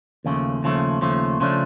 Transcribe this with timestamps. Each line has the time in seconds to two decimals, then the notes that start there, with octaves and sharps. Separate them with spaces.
0.25 D#2 C#3 F3 A3
0.63 D#2 C#3 F3 A3
1.01 D#2 C#3 F3 A3
1.40 C#3 F3 A3 D4